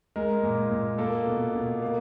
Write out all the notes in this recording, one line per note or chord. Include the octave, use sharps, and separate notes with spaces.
G#3 A#4
A#2
A#2
A#3 A4
B2
B2
A#3